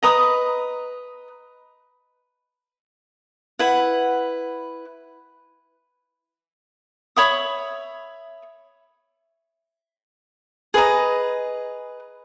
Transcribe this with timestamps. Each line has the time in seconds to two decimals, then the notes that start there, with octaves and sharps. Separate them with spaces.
0.03 B4 D#5 A#5 D#6
3.59 E4 B4 F#5
7.16 C#5 E5 B5 D#6
10.74 G#4 B4 D#5 A#5